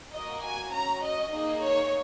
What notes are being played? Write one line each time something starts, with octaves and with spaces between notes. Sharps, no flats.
A#3 F#4 D#5
G#5
C#4 F#4 A#5
D#5
A#3 D#4 G#4 D#5
C#5